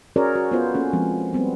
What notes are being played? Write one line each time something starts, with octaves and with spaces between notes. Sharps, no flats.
C#4 F#4 G#4 A#4 C#5 D5
F#4
B3 F4 C5
A#3 C#4 A4
F3 G#3 C4
G3 B3 C4